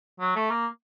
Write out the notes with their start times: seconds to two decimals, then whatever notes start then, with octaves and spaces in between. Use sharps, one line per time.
0.20 F#3
0.36 A3
0.51 A#3